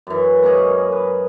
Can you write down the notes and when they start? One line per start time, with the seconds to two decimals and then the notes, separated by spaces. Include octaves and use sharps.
0.07 F#2 E3
0.43 A#3 C#4 G#4 D#5
0.92 B4